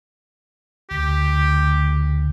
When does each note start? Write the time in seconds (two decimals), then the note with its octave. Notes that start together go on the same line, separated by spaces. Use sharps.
0.90 D2 G4